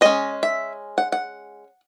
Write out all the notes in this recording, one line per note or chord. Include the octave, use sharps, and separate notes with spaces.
G#3 C#4 D#5
E5
F#5
F#5